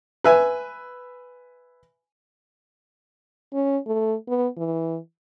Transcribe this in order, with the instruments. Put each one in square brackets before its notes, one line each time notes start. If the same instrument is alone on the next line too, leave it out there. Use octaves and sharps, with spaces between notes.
[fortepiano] B4 E5 G#5
[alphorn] C#4
A3
B3
E3